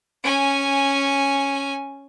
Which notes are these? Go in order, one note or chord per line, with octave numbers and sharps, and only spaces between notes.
C#4 G#5